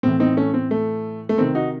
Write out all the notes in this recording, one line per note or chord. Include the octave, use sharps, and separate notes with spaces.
A2 E3 C4
C4 D#4
A3 C#4
C4
A3
A3
C3 D#3 C4
D#4 F#4